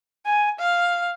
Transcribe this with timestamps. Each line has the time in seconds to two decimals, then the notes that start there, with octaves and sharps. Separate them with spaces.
0.25 G#5
0.59 F5